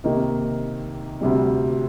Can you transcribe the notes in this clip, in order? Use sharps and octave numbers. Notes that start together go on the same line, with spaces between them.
C3 D#3 A#3 D#4
D2 C3 G3